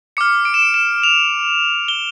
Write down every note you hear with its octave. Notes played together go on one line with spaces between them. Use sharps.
D6 F6 C#7
D7
E7
D7
E7
F7
G7